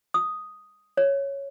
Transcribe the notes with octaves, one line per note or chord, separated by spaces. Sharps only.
D#6
C#5